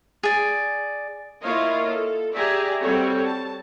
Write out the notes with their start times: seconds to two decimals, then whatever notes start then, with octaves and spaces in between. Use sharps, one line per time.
0.23 G#4 D5
1.43 A#3 E4 F4 C#5 D#5 F5
1.88 A4
2.34 G4 G#4 D5 E5 G#5 A#5
2.80 G3 C4 F#4 A4 C#5
3.25 A5